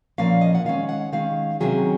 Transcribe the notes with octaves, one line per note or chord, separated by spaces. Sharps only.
A#2 F3 A#3 C#4 F5
D#5
F#5
D#3 G#3 C#4 F5
F#5
D#3 G#3 C#4 F5
C3 D#3 F#3 C#4 G#4